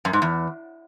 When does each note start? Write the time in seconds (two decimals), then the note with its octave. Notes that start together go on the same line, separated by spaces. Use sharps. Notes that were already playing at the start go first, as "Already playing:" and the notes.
0.05 F#2
0.13 G#2
0.22 E2